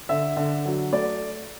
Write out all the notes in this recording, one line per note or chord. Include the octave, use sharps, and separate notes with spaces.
D3 E5
D3
F#3
A3 D5